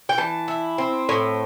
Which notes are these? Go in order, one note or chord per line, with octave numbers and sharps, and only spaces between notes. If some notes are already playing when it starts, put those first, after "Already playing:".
G5
E3 A5
E4
C4
A2